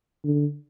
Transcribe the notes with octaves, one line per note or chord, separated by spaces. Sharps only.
D3